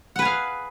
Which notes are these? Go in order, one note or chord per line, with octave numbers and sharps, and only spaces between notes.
G#4 B4 F5 F#5